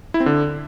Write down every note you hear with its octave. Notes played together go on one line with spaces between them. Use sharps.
E4
C4
D3